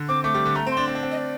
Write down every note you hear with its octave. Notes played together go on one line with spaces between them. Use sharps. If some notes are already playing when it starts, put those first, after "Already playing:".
Already playing: D3
C4 D6
A3 D6
G3
D3
A3 A#5
C4
C6
D4
C4
D4
C4
D#5
D5